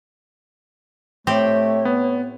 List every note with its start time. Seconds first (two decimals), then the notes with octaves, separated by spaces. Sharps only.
1.27 A2 A3 C4 G4 C#5
1.85 B3